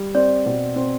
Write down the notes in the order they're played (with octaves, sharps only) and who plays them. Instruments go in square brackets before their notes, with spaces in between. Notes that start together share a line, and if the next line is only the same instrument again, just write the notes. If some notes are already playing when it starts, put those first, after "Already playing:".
Already playing: [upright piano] G3
[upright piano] C4 [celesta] D5
[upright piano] B2
C4